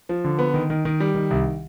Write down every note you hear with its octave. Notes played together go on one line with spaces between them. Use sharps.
F3
D3
B3
D#3
D#3
D#3
G3
D#3
C2